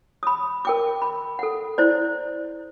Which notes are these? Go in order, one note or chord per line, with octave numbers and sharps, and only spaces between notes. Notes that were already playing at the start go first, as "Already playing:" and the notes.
B5 D#6
A#4 G5 D6
B5
A4 F#5
E4 C5 D5